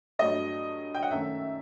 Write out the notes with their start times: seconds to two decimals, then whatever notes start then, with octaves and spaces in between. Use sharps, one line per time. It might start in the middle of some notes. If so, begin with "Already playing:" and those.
0.19 G2 F#3 A3 D#5
0.95 G5
1.03 F#5
1.11 F#2 D#3 A3 E5